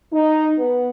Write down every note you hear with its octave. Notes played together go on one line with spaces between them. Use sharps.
D#4
B3